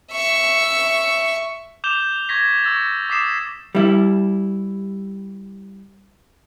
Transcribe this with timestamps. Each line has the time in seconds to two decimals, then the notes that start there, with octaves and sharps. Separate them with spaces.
0.12 E5 C#6
1.84 D6 G6 E7 F7 G7
2.29 C#6 G#6 A#6 B6
2.64 C#6 E6 A6
3.10 D6 D#6 B6 C7 E7
3.75 G3 E4